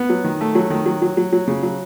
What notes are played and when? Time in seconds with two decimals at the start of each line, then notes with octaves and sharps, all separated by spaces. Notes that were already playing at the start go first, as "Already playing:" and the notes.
Already playing: B3
0.10 F#3
0.24 D#3
0.41 A3
0.55 F#3
0.70 D#3
0.86 F#3
1.02 F#3
1.17 F#3
1.33 F#3
1.48 C#3
1.63 F#3